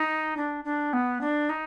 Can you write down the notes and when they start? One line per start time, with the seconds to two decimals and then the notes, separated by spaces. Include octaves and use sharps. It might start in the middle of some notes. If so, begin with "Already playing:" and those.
Already playing: D#4
0.37 D4
0.64 D4
0.93 B3
1.21 D4
1.49 D#4